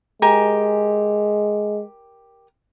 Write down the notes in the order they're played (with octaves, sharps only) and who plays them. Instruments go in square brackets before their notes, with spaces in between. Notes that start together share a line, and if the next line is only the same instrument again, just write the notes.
[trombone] G#3 [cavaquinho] G4 A#4 G#5